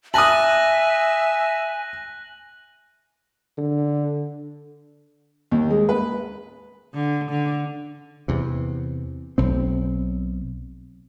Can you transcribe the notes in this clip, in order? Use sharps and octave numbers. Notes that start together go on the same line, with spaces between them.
E5 G#5 A5 D#6 F#6 A#6 F#7
D3
D#2
G#3
B4
D3
D3
E2 C3
B1 C4